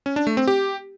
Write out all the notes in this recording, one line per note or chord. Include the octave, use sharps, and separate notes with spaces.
C#4
D4
A3
C4
G4